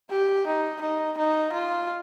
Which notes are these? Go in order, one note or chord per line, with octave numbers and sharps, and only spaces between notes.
G4
D#4
D#4
D#4
F4